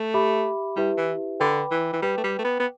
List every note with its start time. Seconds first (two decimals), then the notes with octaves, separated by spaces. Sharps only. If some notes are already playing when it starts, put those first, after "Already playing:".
Already playing: A3
0.14 G4 E5 B5 D6
0.76 G3 E4 G4 B4 E5
0.97 E3
1.40 D3 B4 G5 B5 D6
1.71 E3
1.93 E3
2.02 G3 B4 G5 D6
2.18 A3
2.24 G3
2.39 A3
2.45 B3
2.60 B3